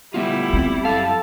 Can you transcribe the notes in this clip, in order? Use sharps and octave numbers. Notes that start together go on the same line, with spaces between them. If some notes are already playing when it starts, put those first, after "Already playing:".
G3 A3 B3 E4 F4
C4
F#2 A4 F5 A5